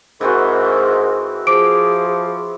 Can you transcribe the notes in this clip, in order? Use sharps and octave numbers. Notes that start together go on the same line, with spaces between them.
G#2 E3 C4 F#4 A#4
F3 G#4 D6 D7